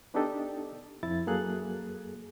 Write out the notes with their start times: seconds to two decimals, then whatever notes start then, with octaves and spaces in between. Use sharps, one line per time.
0.14 B3 D4 D#4 G4 A4 D#5
1.03 F2 F3 E4 A6
1.27 F#2 F#3 A#3 G#4 A4 F#6